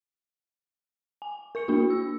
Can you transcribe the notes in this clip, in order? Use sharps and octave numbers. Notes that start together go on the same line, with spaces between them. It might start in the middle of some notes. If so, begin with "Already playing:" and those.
G#5
A#4 C#6 C#7
A#3 D4 F#4
E6